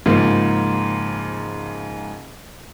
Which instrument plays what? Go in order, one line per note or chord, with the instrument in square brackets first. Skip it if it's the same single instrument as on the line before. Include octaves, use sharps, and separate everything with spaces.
[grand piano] G#2 C#3 F3 A#3